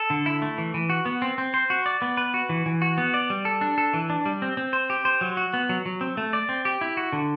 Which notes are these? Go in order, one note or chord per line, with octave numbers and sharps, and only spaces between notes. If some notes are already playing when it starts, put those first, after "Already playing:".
Already playing: A4
D3
E4
A3
E3
E3
F#4
B3
C4
C4
C5
F#4
D5
B3
B4
F#4
E3
E3
F#4
B3
D5
G3
A4
D4
A4
E3
D4
G3
C4
C4
C5
G4
C5
F#3
F#4
B3
F#3
F#3
C4
A3
D5
C4
G4
E4
F#4
D3